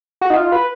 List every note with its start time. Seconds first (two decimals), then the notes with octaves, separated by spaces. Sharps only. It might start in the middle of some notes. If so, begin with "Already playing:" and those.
0.21 F#4
0.30 D#4
0.37 F4
0.52 B4